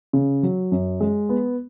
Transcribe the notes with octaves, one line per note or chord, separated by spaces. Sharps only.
C#3
F#3
F#2
G#3
B3